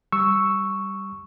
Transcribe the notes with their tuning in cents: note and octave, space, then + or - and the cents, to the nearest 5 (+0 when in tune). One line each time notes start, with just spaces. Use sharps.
G3 +0 C#6 +0 E6 +0